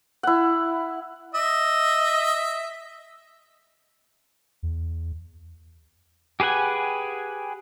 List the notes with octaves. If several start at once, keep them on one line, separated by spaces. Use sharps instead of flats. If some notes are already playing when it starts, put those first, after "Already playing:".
E4 F#5
D#5 E5
E2
G4 G#4 B4 F#5 G#5